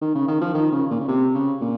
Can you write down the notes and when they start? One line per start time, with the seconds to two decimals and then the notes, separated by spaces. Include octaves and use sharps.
0.01 D#3
0.15 C#3
0.28 D#3
0.41 F3
0.55 D#3
0.72 C#3
0.91 A#2
1.00 C#3
1.08 C3
1.34 C#3
1.62 A#2